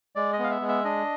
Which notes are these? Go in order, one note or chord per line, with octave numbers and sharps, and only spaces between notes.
G#3 D5
D#5
B3 F5
E5
G#3
E5
D4 D#5